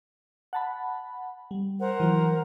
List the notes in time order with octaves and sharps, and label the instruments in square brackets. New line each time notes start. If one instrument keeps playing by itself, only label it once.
[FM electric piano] F#5 A5 B5
G3
[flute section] A#4 C5 F#5
[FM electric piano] E3 F#3